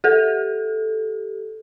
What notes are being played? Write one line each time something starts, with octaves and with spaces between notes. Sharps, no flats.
G4 A4